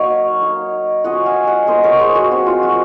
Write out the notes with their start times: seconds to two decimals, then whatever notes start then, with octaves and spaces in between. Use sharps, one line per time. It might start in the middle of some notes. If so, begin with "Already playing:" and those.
Already playing: F#3 A#3 D#4 C#5 F5
0.42 A#3 D#4
1.04 F#3 C#4 F4 D#5 F#5
1.26 F5 G#5
1.47 D#5 F#5
1.67 A#3 D#4 C5 D#5
1.83 A#4 C#5
2.00 G#4 C5
2.15 F#4 A#4
2.31 F#3 C4 D#4 F#4
2.46 F4
2.63 F#4